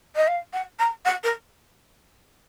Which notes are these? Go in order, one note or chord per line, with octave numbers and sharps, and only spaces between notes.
D#5
F5
F#5
A#5
F#5
A#4